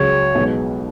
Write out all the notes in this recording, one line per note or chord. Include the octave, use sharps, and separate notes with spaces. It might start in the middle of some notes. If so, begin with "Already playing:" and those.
Already playing: C#2 C#3 F#3 C#5
B1 B2 G#3 B3